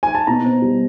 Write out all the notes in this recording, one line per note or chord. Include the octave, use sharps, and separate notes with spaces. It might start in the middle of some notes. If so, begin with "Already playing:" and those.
G#5
A5
B2 A#5
C4
G3